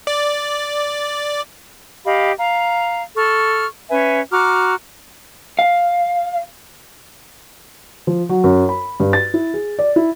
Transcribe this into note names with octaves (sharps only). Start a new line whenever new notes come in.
D5
G4 D#5 F5 B5
F5 A#5
A4 C#6 F6
C#4 B4 E5 G#5
F#4 A#5 D6 F6
F5
F3
F#3
F#2
B5
G2
A6
E4
G#4
D5
E4